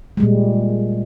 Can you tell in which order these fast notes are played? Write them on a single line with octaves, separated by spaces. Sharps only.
G#3 G3 A#2